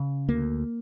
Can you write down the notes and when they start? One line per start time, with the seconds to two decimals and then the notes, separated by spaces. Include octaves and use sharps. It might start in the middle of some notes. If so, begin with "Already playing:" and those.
Already playing: C#3
0.28 D2 A#3